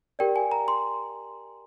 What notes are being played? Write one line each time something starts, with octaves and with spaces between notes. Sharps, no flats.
G4 A#4 D5 G5
G#5
A#5
C6